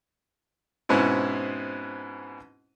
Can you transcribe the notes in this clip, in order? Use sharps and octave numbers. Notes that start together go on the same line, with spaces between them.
G#2 B2 C4 C#4 E4